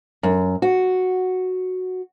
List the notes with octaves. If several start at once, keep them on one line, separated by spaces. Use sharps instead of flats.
F#2
F#4